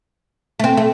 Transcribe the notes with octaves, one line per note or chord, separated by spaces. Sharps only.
A3
C4
A3